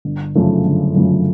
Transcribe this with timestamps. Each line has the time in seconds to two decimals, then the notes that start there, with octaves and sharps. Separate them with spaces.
0.05 G1
0.35 F#2 C#3 F3 A3
0.65 G1
0.96 F#2 C#3 F3 A3